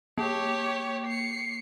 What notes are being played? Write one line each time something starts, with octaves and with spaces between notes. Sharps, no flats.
A#3 G4 C#5
C7 C#7